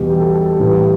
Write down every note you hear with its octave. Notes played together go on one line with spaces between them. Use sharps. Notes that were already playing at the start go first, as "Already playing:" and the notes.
Already playing: E2 B2 G3
G4
A4
A4
G4
A2 E3 G3